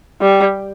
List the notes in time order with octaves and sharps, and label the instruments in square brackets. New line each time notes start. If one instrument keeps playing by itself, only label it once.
[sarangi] G3